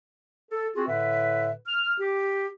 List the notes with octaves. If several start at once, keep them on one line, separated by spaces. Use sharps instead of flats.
A4
C4 F4 F#4 G#4
A2 D3 B4 E5
F6
G4